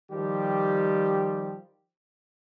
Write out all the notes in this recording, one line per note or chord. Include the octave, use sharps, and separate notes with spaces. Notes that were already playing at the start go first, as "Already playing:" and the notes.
D#3 F3 G3 G4